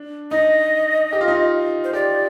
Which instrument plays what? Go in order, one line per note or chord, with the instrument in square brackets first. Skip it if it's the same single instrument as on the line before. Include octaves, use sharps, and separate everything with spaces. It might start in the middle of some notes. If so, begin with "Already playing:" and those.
Already playing: [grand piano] D4
[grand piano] D#4 [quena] D#5
[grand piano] G4
F4
D#4
F4
[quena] C5
[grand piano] G4 [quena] D5